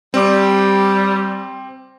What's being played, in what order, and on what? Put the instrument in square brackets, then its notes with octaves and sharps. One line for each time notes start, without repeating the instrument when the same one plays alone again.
[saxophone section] G3 [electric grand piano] C4 D6